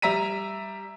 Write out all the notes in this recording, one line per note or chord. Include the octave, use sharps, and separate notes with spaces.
G3 E5 A#5 B6 D#7